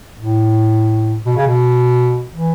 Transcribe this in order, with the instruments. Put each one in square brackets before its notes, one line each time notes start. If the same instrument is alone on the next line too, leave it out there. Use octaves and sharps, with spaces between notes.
[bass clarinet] A2
B2
C#3
B2
E3